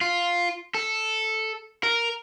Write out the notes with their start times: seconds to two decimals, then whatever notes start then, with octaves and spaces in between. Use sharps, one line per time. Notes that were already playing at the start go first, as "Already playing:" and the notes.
0.01 F4
0.74 A4
1.83 A#4